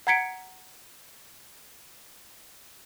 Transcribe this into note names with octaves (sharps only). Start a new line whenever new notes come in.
F#5 A#5 G#6 B6 C#7 D7